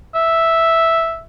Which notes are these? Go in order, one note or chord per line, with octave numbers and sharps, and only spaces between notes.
E5